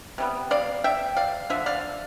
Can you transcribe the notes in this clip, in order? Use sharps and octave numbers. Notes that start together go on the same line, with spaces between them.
C3 G3 B3
D5 F5
E5 G5
D5 F5
D3 F3 E5
D5 F5